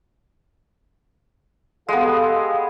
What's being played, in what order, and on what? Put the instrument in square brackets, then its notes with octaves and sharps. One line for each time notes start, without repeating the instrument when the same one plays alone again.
[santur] G#3 B3 [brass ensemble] G4 A4 F5